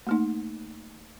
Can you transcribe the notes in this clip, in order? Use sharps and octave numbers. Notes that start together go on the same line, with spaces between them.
A3 A#3 D#4